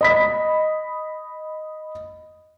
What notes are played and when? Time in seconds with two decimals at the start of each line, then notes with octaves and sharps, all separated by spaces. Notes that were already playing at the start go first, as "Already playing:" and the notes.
0.01 D#5 B5 B6